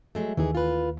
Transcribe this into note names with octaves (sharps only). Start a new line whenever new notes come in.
F#3 G#3 A3
D#2 E3 D#4 G#4
F4 B4